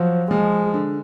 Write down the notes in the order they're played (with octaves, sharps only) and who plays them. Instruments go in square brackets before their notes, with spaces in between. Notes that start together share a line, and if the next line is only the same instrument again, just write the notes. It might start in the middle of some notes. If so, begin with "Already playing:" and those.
Already playing: [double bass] F3 [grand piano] F#3
[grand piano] F3 [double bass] G#3
[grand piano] D3